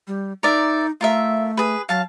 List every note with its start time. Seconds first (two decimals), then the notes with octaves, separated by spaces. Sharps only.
0.07 G3
0.43 D#4 A#4 D5 E5
1.01 A3 F4 A#4 E5
1.57 G#4 B4
1.89 F#3 F5 A5